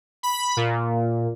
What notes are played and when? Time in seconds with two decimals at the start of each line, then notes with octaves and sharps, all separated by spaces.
0.23 B5
0.57 A#2